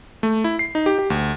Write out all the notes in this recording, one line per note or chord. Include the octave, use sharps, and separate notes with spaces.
A3
E4
C7
D#4
G4
G4
D2